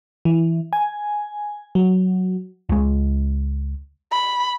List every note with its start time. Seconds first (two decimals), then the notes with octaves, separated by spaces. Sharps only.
0.25 E3
0.73 G#5
1.75 F#3
2.69 C#2 G#3
4.11 B5